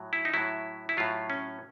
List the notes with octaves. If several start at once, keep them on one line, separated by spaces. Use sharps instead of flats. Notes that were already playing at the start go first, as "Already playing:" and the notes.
Already playing: A2 F#3
E4
D#4
A2 F#3 E4
E4
A2 F#3 F4
C#4